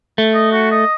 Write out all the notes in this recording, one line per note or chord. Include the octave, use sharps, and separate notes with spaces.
A3
D#5
F#4
D#5